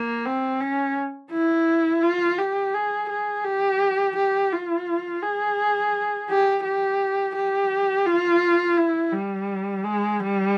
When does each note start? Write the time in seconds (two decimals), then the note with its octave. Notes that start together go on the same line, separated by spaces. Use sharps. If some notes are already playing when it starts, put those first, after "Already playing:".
Already playing: A#3
0.26 C4
0.61 C#4
1.32 E4
2.03 F4
2.38 G4
2.74 G#4
3.09 G#4
3.44 G4
4.16 G4
4.52 F4
5.23 G#4
6.30 G4
6.64 G4
7.36 G4
8.06 F4
8.77 E4
9.13 G3
9.84 G#3
10.20 G3